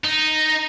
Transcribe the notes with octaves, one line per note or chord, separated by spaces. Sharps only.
D#4